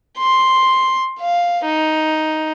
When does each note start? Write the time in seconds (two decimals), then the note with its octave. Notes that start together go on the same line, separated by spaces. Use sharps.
0.18 C6
1.19 F5
1.65 D#4